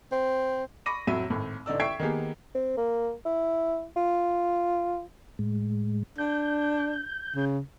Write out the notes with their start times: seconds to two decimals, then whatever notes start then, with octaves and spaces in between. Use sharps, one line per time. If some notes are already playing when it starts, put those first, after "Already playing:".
0.12 C4
0.86 B5 C#6 D6 A#6 D#7
1.07 F2 A2 F#3 E5 E6 D#7
1.30 G#1 A2
1.66 A1 D3 D#4 D5 E6
1.80 E5 G5 C#6 G#6 C7 D7
2.00 D#3 A#3 B3 G4 G#4
2.55 C4
2.77 A#3
3.25 E4
3.96 F4
5.39 A2 G#3
6.18 D4 G6
7.36 C#3